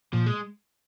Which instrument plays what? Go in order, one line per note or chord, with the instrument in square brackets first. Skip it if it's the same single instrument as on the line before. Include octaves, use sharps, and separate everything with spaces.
[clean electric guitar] A#2 [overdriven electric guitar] F3
[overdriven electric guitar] G#3